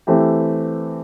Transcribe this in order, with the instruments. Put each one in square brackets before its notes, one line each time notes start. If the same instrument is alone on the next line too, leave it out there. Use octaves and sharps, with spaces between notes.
[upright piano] E3 A3 C4 G4